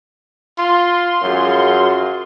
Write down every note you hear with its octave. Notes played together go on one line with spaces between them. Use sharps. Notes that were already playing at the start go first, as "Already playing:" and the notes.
F4 C6
F#2 F4 F#4 G#4